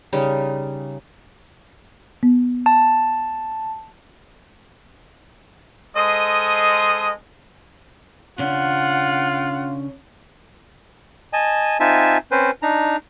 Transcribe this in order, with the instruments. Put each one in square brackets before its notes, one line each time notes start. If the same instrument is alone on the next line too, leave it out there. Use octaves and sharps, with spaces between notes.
[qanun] C#3 G3 C#4 D#4
[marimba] B3
[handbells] A5
[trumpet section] G#3 A4 C5 D#5 D#6
[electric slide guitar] C#3 C#4 D4 [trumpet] F4 [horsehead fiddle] F#5
[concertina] D#5 G#5 A5
C4 D#4 F4 E5 G#5 A5
C4 C#4 B4 C5
D4 D#4 A#5